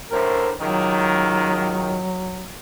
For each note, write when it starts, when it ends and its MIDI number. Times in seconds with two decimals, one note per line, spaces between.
0.11 0.53 38
0.11 0.53 45
0.11 0.51 70
0.11 0.53 72
0.60 1.98 37
0.60 1.98 51
0.60 2.58 54